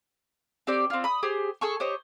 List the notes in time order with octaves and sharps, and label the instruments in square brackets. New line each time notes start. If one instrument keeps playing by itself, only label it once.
[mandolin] C4 G4 D5
C4 F4
B5 D#6
G4 G#4 C5
G#4 A4 C#6
G4 C5 C#5 D#5